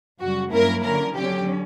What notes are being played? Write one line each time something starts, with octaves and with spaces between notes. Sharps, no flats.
F#2 C#3 G3 F#4
G2 F#3 A#3 C#4 E4 A#4
D3 F#3 C#4 A#4
D3 F#3 C#4 G4